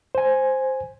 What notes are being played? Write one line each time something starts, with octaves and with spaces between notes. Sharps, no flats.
C5 G#5